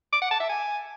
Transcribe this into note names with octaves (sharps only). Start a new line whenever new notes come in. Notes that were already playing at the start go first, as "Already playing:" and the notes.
D6
F#5
A5
E5
G#5